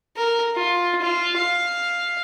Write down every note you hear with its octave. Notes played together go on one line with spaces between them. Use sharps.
A#4
F4
F4
F5